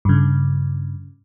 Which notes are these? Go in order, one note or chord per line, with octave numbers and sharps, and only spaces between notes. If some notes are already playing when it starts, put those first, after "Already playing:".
G2 C#3